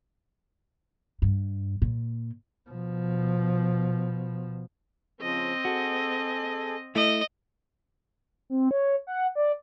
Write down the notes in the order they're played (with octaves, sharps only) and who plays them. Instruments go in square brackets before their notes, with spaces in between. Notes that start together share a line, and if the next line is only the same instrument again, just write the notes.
[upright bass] G2
A#2
[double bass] B2 F3
[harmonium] C#3 F3 [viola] C4 D#5
[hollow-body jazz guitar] F#4 [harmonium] G#4 A4
[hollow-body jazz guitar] A3 E4 [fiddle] D#5
[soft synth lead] C4
C#5
F#5
D5